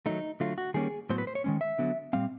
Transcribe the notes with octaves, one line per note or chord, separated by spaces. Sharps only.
D#3 F#3 A3 D#4
D3 F#3 A3 F4
F#4
D#3 G3 A#3 C#4 G#4
A2 F#3 B3 C5
B4
C5
C#5
D#3 G#3 C#4
E5
D3 F#3 B3
A#2 G3 C4 F5